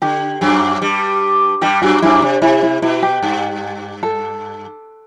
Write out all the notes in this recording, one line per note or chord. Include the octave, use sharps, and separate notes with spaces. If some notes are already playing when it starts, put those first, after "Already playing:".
D3 G4
F#2 F#3
G2 G3
G2 G3 G4
F#2 F#3 F#4
F#2 F#3 E4
C3 D4
C3 E4
E4
B2 E4
G4
G2
A4